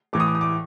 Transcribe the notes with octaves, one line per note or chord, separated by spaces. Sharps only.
A2 E3 A3 D6
D#6
D6
D#6
D6